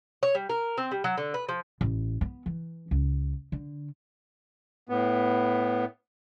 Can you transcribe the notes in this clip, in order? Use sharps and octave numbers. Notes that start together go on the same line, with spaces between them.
C#5
G3
A#4
C4
G3
F#3
D3
B4
F3
A1
B3
E3
C#2
D3
A2 B3